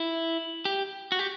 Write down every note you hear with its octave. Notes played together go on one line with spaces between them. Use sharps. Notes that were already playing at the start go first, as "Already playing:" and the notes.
Already playing: E4
G4
F#4
G4